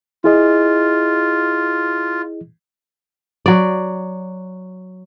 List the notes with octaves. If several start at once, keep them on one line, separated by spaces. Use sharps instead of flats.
E4 F4 G#4 D#5
F#3 D5